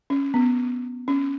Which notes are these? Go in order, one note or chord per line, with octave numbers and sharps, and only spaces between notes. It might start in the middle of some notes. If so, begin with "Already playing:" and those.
C#4
B3
C#4